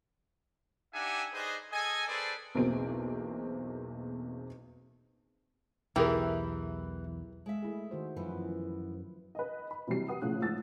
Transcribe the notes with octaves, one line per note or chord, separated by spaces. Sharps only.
D4 D#4 G4 E5 F#5 G#5
D#4 G#4 B4 C5 D5 D#5
G#4 A4 D#5 G#5
C4 G#4 A4 B4 C5 D5
B1 E2 A#3 C4 D7
B1 E2 E3 G4 G#4 A#4
G#3 E5
A3 E4 G#4
D#3 F#4 C5
F#2 E3 F3 B3 F4 B4
B4 D#5
B5
C3 E3 F#3 G3 C7
G4 B4 F#5 D#6
A#1 A2 C#3 F#6
A1 G#2 E6 A6